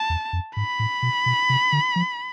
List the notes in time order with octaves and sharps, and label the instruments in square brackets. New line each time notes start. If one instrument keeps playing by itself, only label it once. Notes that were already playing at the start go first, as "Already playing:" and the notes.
Already playing: [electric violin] A5
[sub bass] E2
F2
[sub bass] G#2 [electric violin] B5
[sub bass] A2
B2
B2
C3
D3
F3